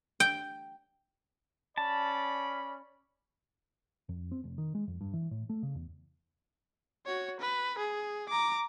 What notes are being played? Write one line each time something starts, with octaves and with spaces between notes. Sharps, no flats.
G5
C#4 D5 A5 B5
F2
C4
F1
D#3
G#3
F2
G2
E3
A2
A3
C#3
E2
F#4 C#5
B4
G#4
A#5 D6